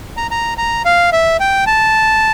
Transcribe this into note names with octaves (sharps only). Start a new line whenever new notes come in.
A#5
A#5
A#5
F5
E5
G5
A5